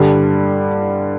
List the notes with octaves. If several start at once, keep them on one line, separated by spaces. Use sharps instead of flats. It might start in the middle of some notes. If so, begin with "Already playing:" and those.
Already playing: G2 D3 G3